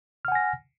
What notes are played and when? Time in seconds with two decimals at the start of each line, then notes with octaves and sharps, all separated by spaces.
0.25 F6
0.28 F#5
0.32 G#5
0.35 A#6